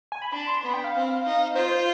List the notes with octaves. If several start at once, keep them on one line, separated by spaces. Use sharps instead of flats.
G#5
B5
D4 B5
C6
B3 B5
G5
F5
C4
D#4
F4 C5
C5